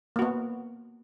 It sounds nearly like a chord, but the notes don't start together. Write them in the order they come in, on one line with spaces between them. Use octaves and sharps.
A#3 F#4 B3